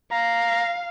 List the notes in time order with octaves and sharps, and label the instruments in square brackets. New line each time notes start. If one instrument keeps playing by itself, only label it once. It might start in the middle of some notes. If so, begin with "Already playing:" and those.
[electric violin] F5 [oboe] A#5